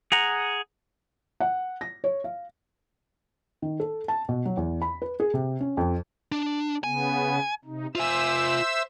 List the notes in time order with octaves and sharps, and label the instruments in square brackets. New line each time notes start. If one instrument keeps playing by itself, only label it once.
[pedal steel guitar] G#4 F#5 A#5
[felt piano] F#5
A#6
C#5
F5
D#3
A4
A5
B2
F#3
E2
B5
B4
G#4
C3
C#4
F2
[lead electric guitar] D4
[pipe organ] C#3 B3 [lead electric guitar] G#5
[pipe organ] C3 D#4
[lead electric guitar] F4 G#5 [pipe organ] C5 E5 E6